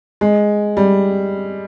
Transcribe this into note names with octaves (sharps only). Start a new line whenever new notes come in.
G#3
G3